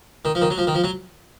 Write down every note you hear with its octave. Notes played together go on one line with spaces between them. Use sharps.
D#3
F3
D#3
F#3
F3
D#3
F3
F#3